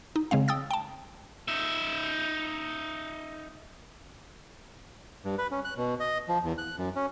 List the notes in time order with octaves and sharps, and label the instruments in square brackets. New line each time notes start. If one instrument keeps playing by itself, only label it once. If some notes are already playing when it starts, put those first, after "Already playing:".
[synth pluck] D#4
C#3 G#3 C4 F5
G5 D#6 E6 A6
G5 A5
[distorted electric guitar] D#4 E5
[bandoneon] G2
B4
C#4
F#6
B2
D#5
F3
E2
F#6
F#2
C#4